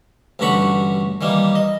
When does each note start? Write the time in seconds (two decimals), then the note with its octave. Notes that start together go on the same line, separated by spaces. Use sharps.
0.39 A1 G2 D3 F#4 B5 C#6
1.21 D#3 E3 G3 A#3
1.55 D#5